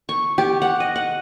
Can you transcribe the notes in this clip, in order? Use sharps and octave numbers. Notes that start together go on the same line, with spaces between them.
C#6
G4
F#5
D#5
F#5